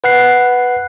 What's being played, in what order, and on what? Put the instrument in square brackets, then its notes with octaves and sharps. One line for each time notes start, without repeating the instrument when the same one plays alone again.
[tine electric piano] B4 F#5 F#6 C7